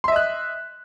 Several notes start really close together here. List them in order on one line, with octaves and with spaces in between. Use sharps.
C6 E5 D#5 F#6